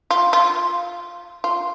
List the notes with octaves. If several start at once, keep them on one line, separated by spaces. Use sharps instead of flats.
F4
F4
F4